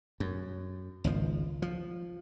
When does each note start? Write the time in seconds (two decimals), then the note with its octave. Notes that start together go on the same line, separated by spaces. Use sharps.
0.20 F#2
1.04 G#1 C#2 F3
1.62 F3